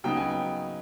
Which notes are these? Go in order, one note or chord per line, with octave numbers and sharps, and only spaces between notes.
C#3 F#3 B3 D#4 G5
G#5
G5